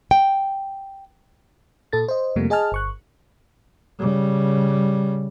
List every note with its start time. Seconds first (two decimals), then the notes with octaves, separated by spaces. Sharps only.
0.11 G5
1.93 A#2 A4 A6
2.08 C5 D#5
2.36 F2 C3 F3 G3 A3 A#3
2.50 G#4 D#5 G#5 A5 F6
2.72 G1 C#6 F#6
3.99 C#3 G3